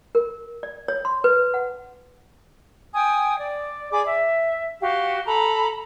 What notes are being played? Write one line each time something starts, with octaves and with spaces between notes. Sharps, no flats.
A#4
D5
C#5
C6
B4
F#5
G5 G#5 D#6
D5
G#4 D5 B5 D6
E5
F#4 G4 F5
A4 A#5 B5